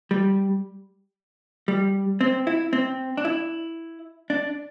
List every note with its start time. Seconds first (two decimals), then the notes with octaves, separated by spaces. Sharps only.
0.11 G3
1.68 G3
2.21 C4
2.47 E4
2.73 C4
3.17 D4
3.25 E4
4.30 D4